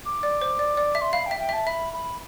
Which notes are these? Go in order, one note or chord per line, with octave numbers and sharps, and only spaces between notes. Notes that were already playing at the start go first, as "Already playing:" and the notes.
D6
D5
C5
D5
D5
E5
C6
F5 B5
G5
E5
G5
E5
A5
E5 B5
B5